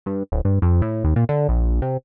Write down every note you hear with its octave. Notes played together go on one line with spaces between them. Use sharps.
G2
D1
G2
F2
A2
D#2
A#2
D3
A#1
C3